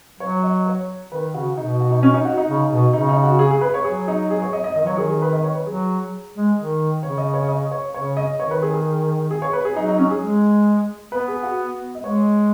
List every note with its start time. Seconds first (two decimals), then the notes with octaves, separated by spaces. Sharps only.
0.20 F#3 C#5
0.43 D#5
0.66 C#5
1.12 D#3 B4
1.34 C#3 F#4
1.57 B2 D#4
1.80 F#4
1.91 D#4
2.03 C#4
2.14 D#4
2.25 F#4
2.37 D#4
2.48 C#3
2.72 B2
2.93 C#3 D#4
3.08 D#4
3.24 F#4
3.39 G#4
3.51 G#4
3.61 B4
3.74 C#5
3.84 F#3 G#4
4.08 D#4
4.30 G#4
4.42 C#5
4.53 D#5
4.64 D#5
4.75 D#3 D#5
4.86 F#3 C#5
4.96 D#3 G#4
5.10 G#4
5.22 B4
5.33 D#5
5.44 C#5
5.55 B4
5.66 F#3 G#4
6.35 G#3
6.58 D#3
7.03 C#3 C#5
7.18 D#5
7.34 C#5
7.48 D#5
7.71 C#5
7.94 C#3 C#5
8.17 D#5
8.39 D#3 C#5
8.51 B4
8.62 G#4
8.74 G#4
9.31 G#4
9.42 C#5
9.53 B4
9.65 G#4
9.76 F#3 D#4
9.88 D#4
9.99 C#4
10.11 G#4
10.22 G#3
11.12 B3 B4
11.28 G#4
11.43 F#4
11.95 D#5
12.03 G#3 C#5